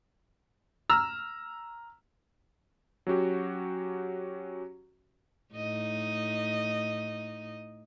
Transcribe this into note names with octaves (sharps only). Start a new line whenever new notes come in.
A#5 E6 F6
F#3 C#4 F#4 G4
A2 D#4 D#5